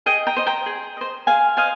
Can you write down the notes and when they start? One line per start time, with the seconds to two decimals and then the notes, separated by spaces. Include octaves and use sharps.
0.06 G#4 D#5 G5
0.27 G5 A#5
0.37 C5 D#5
0.47 G5 A#5
0.66 G#4
0.97 C5 D#5
1.27 G#4 F5 G#5
1.57 C5 D#5 F5 G#5